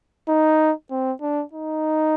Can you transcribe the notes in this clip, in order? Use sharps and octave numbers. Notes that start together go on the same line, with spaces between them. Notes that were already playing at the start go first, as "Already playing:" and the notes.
D#4
C4
D4
D#4